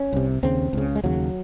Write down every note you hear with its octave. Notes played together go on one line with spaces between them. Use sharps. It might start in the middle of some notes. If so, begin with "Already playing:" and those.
Already playing: C#4
C2 C3
D#2 C#3 C4
C#2 C#3
G#3
D#2 C#3 F#3